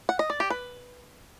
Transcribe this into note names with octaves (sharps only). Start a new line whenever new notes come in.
F#5
D#5
D5
G4
B4